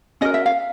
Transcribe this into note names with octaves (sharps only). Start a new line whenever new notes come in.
C#4 F#4 A#4 D#5
E5
F5